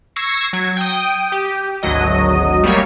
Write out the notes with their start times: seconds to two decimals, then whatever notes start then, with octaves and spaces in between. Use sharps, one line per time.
0.16 C#6 E6 G#6 A#6 C7 C#7
0.53 F#3 G#6
0.77 G5 D#6
1.32 G4
1.82 G#1 D2 F#3 D#5 D#7
2.63 G3 A3 A#3 C#5